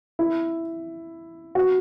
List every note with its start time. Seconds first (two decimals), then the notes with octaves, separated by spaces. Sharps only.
0.19 E4
1.55 F#4